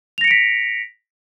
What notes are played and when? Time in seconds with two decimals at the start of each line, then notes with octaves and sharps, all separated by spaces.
0.18 F7
0.21 A#6
0.24 C#7
0.28 D7
0.31 B6